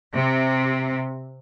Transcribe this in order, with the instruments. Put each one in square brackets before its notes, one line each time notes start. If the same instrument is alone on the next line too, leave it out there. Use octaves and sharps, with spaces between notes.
[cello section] C3